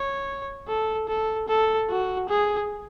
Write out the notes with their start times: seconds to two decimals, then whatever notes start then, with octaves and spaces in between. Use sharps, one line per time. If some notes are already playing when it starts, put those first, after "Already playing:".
Already playing: C#5
0.68 A4
1.09 A4
1.48 A4
1.89 F#4
2.29 G#4